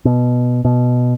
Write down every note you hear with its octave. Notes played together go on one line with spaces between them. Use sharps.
B2
B2